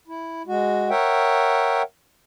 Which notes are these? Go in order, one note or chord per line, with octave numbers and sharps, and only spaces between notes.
E4
G#3 F#4
A#4 C#5 E5 F#5 G5